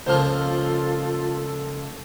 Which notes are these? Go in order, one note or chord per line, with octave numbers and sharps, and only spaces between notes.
C#2 F3 A#3 F4 A4 C5 F6